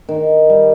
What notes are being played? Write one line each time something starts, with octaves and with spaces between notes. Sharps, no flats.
D#3
G3